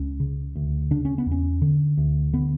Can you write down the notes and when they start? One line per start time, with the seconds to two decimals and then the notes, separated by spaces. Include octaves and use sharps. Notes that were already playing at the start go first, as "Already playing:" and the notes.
Already playing: C#2 C#4
0.20 C#3
0.56 D2
0.91 C#3 D4
1.05 C#4
1.18 B3
1.26 E2
1.32 C#4
1.62 D3
1.98 D2
2.33 D3 B3